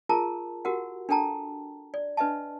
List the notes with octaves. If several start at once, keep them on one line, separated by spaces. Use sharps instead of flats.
F4 G#4 A#4 A5 A#5
F#4 G4 A#4 F#5
D4 A4 G5 A5 A#5
D5
D4 B4 D#5 E5 A5